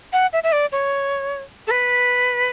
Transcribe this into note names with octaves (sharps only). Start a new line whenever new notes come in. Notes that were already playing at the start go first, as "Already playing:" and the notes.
F#5
E5
E5
D5
C#5
A4
B4